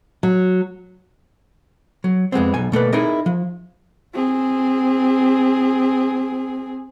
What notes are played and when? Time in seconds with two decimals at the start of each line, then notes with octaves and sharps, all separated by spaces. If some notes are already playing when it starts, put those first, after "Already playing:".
0.23 F#3
2.04 F#3
2.32 F2 G#3 B3 C4
2.54 B1 B2 G#5
2.72 B2 A3 A#3 B4
2.93 D#4 E4 G#4 A#4 D#5
3.26 F3
4.13 C4 G#4